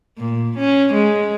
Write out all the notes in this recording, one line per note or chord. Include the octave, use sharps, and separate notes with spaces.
A#2
C#4
G#3